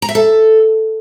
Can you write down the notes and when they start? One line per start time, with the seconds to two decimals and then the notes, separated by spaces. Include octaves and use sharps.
0.02 A#5
0.09 E5
0.15 A4